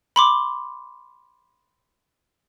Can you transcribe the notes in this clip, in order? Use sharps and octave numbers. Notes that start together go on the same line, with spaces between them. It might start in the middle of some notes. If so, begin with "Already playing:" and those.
B5 C6 D6